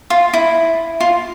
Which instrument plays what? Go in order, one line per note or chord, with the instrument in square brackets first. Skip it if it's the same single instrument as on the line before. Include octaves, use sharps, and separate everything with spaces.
[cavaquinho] F4
E4
F4